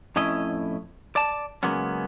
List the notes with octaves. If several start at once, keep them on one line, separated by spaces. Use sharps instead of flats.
F2 A2 C#4 E4 D#5
D5 A5
C#3 F#3 G#3 A#3 B3 C#4